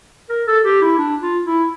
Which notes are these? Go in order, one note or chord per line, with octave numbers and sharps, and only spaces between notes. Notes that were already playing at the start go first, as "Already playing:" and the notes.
A#4
A4
G4
E4
D4
F4
E4